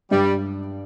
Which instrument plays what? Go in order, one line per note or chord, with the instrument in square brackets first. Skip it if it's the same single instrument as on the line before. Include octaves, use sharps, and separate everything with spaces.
[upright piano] G2 [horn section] G3